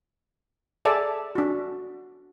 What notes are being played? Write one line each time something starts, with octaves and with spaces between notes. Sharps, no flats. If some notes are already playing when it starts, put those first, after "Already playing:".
G#4 A4 D5 E5 A5
D4 F#4